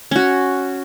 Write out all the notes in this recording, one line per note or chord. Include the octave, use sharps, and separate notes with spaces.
C#4 F#4